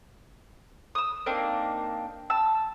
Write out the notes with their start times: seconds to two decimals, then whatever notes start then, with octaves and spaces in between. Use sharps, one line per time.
0.95 D#6 E6
1.26 A#3 C4 D4 D#4
2.30 A5 E6